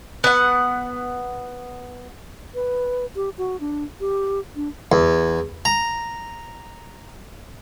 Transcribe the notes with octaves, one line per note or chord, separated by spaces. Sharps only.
B3 F#5
B4
G4
F#4
D4
G4
D4
E2
A#5